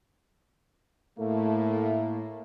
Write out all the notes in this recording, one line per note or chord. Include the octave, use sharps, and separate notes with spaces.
A2 A3 A#3